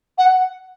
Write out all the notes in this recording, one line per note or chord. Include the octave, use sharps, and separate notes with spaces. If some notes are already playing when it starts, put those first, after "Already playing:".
F#5